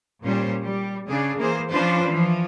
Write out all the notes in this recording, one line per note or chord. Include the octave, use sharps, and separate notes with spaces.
A#2 G3 C#4 C5
G3
C#3 D4 G#4
E3 A#3 G#4 C5
F3 C#4 D4 F4 B4 C5
E3 F3